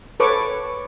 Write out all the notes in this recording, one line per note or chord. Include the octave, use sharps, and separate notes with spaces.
A4 B4 C#5 C#6 D6